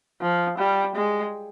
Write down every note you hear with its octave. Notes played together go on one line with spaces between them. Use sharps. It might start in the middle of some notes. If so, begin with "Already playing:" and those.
F3
G3
G#3